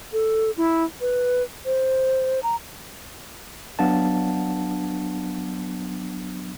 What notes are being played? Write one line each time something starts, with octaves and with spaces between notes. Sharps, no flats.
A4
E4
B4
C5
A#5
F#3 B3 D4 F5 F#5 A5